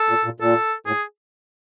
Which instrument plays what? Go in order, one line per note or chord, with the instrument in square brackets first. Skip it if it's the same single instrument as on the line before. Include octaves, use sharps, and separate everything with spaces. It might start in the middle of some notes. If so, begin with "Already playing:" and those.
Already playing: [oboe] A4
[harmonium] A#2
A#2
[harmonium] A#2 [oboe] A4
[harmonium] A2 [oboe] G#4